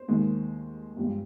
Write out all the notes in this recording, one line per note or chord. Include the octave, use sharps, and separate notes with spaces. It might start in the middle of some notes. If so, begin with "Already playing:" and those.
Already playing: C5
D#2 D#3 G#3
G2 F3 G#3 G4